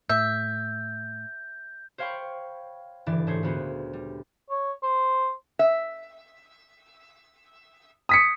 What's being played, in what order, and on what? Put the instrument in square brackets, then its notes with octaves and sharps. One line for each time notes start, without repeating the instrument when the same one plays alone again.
[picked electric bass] A2 [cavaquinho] E5 [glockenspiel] G6
[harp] C5 C#5 F5 G5 B5 C#6
F#1 G2 D3 E3 D5 A6
G#2 A3 G#4 C5 C#5
D2 A#2 B3 F#4 C5
G3
[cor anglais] C#5
C5
[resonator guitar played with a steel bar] E5
[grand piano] D#6 B6 C#7